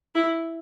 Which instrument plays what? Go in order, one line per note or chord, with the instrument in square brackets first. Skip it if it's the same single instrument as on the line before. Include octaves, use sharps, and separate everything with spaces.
[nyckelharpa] E4